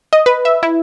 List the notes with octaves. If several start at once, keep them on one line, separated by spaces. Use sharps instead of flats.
D#5
B4
E5
E4